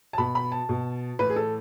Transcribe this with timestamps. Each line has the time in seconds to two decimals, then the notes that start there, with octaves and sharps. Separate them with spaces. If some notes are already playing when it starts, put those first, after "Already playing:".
0.13 A5
0.18 B2 B5
0.35 B5
0.52 A5
0.69 B2
1.19 A2 E3 B4
1.30 G#4
1.36 A4